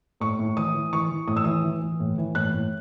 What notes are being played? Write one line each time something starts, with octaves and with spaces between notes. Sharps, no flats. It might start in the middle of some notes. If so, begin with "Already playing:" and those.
A2 C#6
A2
E3 D#6
E3
E3 C#6
E3
A2 D#6
E6
E3 D#6
E3
E3
A2
E3
A2 F#6
A2